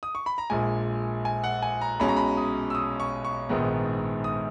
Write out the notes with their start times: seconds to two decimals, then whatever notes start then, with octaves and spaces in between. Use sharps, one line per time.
0.03 D#6
0.15 C#6
0.26 B5
0.38 A#5
0.50 A#1 A#2 G#3 G#5
1.25 G#5
1.44 F#5
1.62 G#5
1.81 A#5
2.00 B1 B2 G#3 C#4 B5
2.08 A#5
2.16 B5
2.37 D#6
2.70 E6
2.75 D#6
3.00 C#6
3.25 C#6
3.49 A#1 G#2 D#3 G#3 B3
4.24 D#6